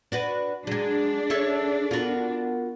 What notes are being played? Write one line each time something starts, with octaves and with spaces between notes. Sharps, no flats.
D4 F#4 B4
F#3 G#3 D4 G#4
A4 C#5 E5
B3 F4 F#4 A#4 F#5